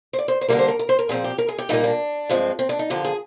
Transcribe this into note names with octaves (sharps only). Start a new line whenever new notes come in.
C5
D5
C5
C5
D3 G3 A#3 A#4
C5
A#4
A#4
C5
A#4
A#2 F3 C4 G#4
G4
A#4
G#4
G4
A#2 G3 A#3 D#4
D4
G2 F3 G#3 C4
C4
D4
D#4
D3 F3 A#3 G4
G#4